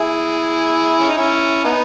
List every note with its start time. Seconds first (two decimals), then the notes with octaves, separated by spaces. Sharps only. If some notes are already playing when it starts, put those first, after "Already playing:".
Already playing: E4 G#4
1.00 C#4
1.09 D#4
1.17 C#4 E4
1.64 B3 D#4